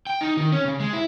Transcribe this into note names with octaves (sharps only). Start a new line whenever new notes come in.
G5
D#4
D#3
C#4
C#3
G#3
E4